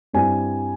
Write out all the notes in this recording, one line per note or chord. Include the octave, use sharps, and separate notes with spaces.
G2 G3 C4 E4 G#5